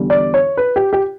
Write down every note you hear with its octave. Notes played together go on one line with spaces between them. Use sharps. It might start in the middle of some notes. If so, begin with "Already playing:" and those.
Already playing: E2 D3 G3
D5
C#5
B4
G4
G4